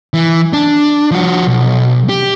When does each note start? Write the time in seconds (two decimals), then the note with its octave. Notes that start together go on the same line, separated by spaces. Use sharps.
0.14 E3
0.53 D4
1.11 F3 F#4
1.47 B1
2.09 G4